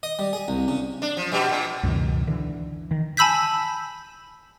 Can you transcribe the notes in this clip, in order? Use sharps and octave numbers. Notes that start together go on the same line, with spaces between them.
D#5
G3
G#4
C2
C#3
D4
F3
B2 G3
A#2
C#2 F#2 B2 D#3
D3 E3
D#3
G#5 A5 B5 E6 G6 B6